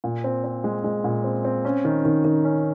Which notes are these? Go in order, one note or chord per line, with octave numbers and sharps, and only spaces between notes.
A#2
C4
C4
G#3
G#3
A#2
C4
C4
C#4
D#3
D#3
D#3
C#4